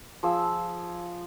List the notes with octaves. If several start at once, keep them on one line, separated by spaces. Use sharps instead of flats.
F3 G#4 E6